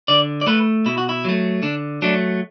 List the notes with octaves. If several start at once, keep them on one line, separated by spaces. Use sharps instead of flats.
D3 D5
D5
A3 B4
B2 E4
F#4
E4
F#3 A3
D3 D4
F#3 A3 D4